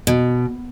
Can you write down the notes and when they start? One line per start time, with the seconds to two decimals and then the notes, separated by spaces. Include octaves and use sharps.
0.07 B2